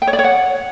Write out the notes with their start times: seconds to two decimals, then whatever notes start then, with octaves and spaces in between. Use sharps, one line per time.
0.02 G5
0.07 C#5
0.13 D5
0.19 C#5
0.24 F#5